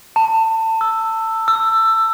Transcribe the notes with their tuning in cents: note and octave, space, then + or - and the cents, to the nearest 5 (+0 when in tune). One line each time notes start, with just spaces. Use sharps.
A5 +25
E6 +5
E6 +15